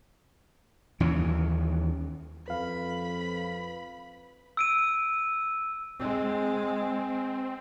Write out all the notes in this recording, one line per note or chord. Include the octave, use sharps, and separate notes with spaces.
D#2 E3 C#4
F2 B4 F5 B5
E6 D7 D#7
G#3 C4